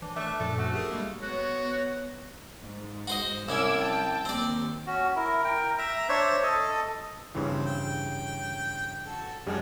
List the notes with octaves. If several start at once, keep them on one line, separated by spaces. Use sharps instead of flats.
E3 D4
A3 D4 E5 C#6 F#6
F#2 A#2 F3 A4
A3 F#4
G4 G#4 A#4
G3 G#3 A#3
B3 F#4 C#5
G#2
F#4 C5 D#5
C2 C#4 D6 E6 G#6
G5 A5
D#2 C4 D5
C#4 F#4
E4 A#4
A#4 G5
E5 A#5
D4 C5 C#5 E5
A4 D#5
G2 C#3 E3 C4
G5
F#4 A4
F#2 D3 G3 G#3 D4 F#4